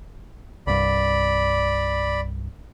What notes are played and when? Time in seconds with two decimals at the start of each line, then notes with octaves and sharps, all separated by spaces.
0.67 C2 G2 D5 B5